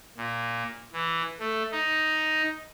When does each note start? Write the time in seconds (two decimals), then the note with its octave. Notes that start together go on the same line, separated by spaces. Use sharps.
0.17 A#2
0.93 E3
1.40 A3
1.72 D#4